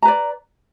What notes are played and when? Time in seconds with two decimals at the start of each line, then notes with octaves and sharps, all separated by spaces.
0.02 A#5
0.05 B4
0.08 D5